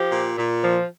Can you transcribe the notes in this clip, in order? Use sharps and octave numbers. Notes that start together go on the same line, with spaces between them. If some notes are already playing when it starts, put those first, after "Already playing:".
Already playing: F3 G4
A#2
A#2
F3